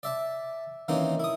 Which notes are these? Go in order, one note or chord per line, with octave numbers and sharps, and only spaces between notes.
D5 E5 A5
D#3 E3 A#3 C4 C#4 D#4
E4 D#6